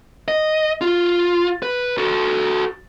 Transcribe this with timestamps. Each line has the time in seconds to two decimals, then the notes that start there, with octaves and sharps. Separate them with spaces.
0.28 D#5
0.81 F4
1.63 B4
1.98 F#4 A4